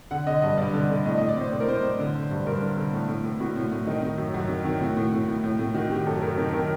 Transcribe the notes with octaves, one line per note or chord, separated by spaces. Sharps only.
D3 F#5
D3 D#5
G2 D#5
G2 D5
D3
D3
A2 D#5
A2 D#5
D5
A2 C5
A2 C5
A#4
A2 C5
A2
D3
D3
G2
G2 A#4
D3
D3
A2
A2
A2
A2 F#4
A2
A2
D#3 D#4
D#3
F#2
F#2 F#4
D#3
D#3
A2 F#4
A2
A2
A2
A2
A2
D#3 F#4
D#3 G4
F#2 A4
F#2 A#4
D#3 A#4
D#3 A#4